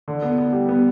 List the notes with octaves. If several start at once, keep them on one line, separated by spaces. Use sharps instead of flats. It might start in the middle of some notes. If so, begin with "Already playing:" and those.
D3
B3
B3
G3
B3